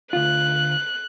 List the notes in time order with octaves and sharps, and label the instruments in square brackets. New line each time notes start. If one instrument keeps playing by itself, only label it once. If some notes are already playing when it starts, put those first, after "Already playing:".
[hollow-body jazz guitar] D2 F4 [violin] F#6